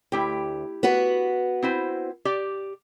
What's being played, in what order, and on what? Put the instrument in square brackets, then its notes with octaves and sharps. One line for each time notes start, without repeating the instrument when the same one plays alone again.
[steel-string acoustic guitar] D2 [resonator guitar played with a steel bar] E4 G4 G5
[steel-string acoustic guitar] B3 F#4 B4
[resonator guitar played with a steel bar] C4 E4 C5
G4 D5